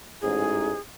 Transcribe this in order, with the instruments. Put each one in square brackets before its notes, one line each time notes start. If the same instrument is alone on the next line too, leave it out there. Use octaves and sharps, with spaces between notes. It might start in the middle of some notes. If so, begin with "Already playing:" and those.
[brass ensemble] A1 G#2 [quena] G#4